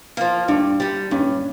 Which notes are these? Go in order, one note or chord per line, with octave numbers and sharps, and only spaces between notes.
F3 A#3
G2 D4
D3 G3
G2 C#4